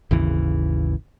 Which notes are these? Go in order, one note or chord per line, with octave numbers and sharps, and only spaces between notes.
G#1 D#2 C#3 E3